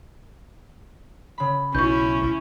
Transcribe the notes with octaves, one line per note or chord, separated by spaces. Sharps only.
C#3 B5
B1 C#4 E4 C#6 G6